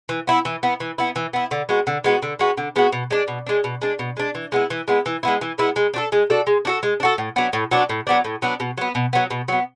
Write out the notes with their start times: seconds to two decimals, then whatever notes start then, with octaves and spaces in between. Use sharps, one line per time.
0.09 E3
0.27 B3 E4
0.45 E3
0.63 B3 E4
0.80 E3
0.98 B3 E4
1.16 E3
1.33 B3 E4
1.51 D3
1.69 G#3 B3 F#4
1.87 D3
2.04 G#3 B3 F#4
2.22 D3
2.39 G#3 B3 F#4
2.57 D3
2.76 G#3 B3 F#4
2.92 B2
3.11 G#3 D4
3.28 B2
3.46 G#3 D4
3.64 B2
3.82 G#3 D4
3.99 B2
4.17 G#3 D4
4.35 E3
4.52 G#3 B3 E4
4.70 E3
4.88 G#3 B3 E4
5.06 E3
5.23 G#3 B3 E4
5.41 E3
5.58 G#3 B3 E4
5.76 G#3
5.94 D4 F#4 A4
6.12 G#3
6.30 D4 F#4 A4
6.47 G#3
6.65 D4 F#4 A4
6.83 G#3
7.00 D4
7.03 F#4 A4
7.18 A2
7.36 F#3 B3 D4
7.53 A2
7.71 F#3 B3 D4
7.89 A2
8.07 F#3 B3 D4
8.25 A2
8.42 F#3 B3 D4
8.60 B2
8.77 F#3 B3
8.95 B2
9.13 F#3 B3
9.30 B2
9.48 F#3 B3